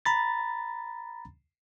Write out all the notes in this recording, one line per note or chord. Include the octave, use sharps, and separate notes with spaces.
A#5 B5 A6